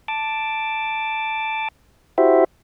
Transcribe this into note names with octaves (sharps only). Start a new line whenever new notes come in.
A5 D6
E4 F#4 G4 C5 E5